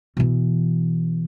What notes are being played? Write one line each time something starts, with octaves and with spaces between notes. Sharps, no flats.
B2 E3